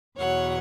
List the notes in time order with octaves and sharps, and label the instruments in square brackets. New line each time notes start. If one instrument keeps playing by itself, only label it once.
[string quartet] E2 B2 F#3 C#5 F#5